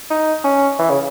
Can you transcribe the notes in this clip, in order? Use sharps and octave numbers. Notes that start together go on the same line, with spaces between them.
D#4
C#4
E3
C#3